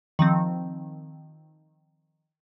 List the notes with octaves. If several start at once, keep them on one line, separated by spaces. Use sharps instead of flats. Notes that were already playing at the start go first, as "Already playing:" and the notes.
D#3 F3 C4